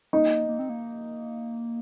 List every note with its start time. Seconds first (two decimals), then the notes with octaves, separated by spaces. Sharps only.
0.13 A#3 D#4
0.48 A#3
0.59 C4
0.69 A#3